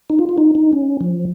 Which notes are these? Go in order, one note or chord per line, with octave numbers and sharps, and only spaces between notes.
D#4
F4
F4
D#4
D#4
C#4
F3